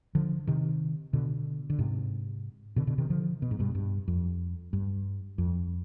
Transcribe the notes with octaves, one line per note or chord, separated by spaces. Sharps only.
D3 F3
C3 D#3
B2 D3
D3
G#2 C3
B2 D3
B2 D3
C3 D#3
D3 F3
B2
G#2
G2 B2
G2
F2
G2
F2